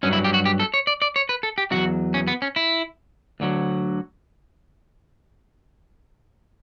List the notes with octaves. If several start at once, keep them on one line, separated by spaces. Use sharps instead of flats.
G2 F#3 C#4
E4
G4
F#4
G4
A4
C#5
D5
D5
C#5
B4
A4
G4
E2 B2 F#3 F#4
C#4
B3
C#4
E4
D2 D3 F#3